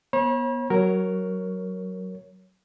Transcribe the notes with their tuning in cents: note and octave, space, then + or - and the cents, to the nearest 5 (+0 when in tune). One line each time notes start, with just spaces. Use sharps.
B3 -30 C#5 -40 B5 -40
F#3 +15 A#4 +0 C#5 +0